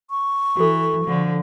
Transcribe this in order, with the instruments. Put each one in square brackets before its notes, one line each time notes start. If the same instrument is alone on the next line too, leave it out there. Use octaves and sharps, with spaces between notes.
[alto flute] C#6
[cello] E3 [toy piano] F#4 A4
[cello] D3 F3